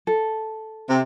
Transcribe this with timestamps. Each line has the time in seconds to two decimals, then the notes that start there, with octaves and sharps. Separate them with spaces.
0.07 A4
0.90 C3